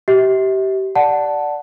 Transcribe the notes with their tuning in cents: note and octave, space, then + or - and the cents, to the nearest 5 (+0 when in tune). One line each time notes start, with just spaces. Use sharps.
G4 -25 E5 -35
D5 +0 F#5 +0 A5 +0